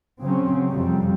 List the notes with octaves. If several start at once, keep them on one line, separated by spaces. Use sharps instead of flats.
C#3 F#3 C4 C#4
F2 C3 G3